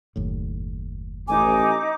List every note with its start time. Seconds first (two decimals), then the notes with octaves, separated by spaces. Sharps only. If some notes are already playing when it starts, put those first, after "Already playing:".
0.16 F#1 D#2 A2
1.28 A1 D#4 G#5 D6